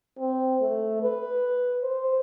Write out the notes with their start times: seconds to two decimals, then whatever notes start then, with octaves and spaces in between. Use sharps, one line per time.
0.19 C4
0.61 A3
1.03 B4
1.83 C5